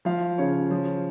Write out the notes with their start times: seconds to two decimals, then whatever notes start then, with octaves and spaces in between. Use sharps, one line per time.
0.05 F3 F5
0.38 C#3 C#5
0.71 F3